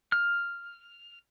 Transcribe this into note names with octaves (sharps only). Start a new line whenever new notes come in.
F6